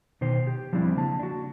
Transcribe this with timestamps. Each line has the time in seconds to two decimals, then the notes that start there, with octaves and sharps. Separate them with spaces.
0.21 B2 D#3 C5
0.47 G4
0.73 F3 G3 C4 D4 E4
0.96 C#3 A#3 A5
1.19 D4 F#4